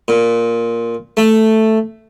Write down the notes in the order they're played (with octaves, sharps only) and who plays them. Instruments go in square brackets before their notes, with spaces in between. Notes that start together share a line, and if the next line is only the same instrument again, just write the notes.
[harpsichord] A#2
A3